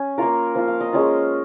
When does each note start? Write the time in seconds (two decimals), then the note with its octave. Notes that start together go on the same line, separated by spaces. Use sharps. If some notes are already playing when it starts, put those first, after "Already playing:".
Already playing: C#4 G#5
0.18 A#3 F4 A#4
0.55 F3 A#3 F4
0.68 F5
0.80 D#5
0.93 G#3 C#4 F4